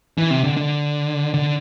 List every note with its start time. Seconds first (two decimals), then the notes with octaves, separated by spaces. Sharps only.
0.18 E3
0.31 C3
0.44 D3
0.57 D3
1.34 D3